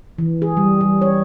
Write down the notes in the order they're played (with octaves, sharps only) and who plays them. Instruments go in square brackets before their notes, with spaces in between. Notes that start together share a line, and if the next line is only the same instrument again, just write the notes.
[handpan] E3
G#4
G3
G3
C#5